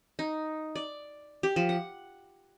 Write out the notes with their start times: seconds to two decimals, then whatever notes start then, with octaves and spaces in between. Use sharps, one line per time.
0.19 D#4
0.75 D5
1.43 G4
1.56 F3
1.69 F#5